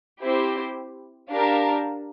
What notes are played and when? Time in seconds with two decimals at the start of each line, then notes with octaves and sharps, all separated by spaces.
0.21 C4 E4 G4 C5
1.32 D4 G4 A#4 F5 A5